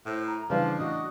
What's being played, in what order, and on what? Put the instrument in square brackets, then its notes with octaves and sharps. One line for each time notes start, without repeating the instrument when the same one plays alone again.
[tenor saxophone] A2 [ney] C5
[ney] A#5
[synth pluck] C#3 E3 G3 [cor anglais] F3 [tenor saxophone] D4 [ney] F5
[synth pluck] A2 [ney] F#4 [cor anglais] D#5